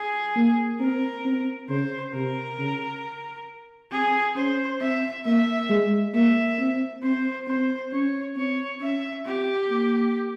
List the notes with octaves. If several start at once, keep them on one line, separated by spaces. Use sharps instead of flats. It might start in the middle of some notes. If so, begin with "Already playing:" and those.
Already playing: G#4
A#3
C4 A#4
C4
C#3 C5
C3 A#4
C#3
C4 G#4
C#4 C5
C4 E5
A#3 E5
G#3
A#3 E5
C4
C4 C5
C4 C5
C#4 C#5
C4 C#5
C#4 E5
C4 G4
A#3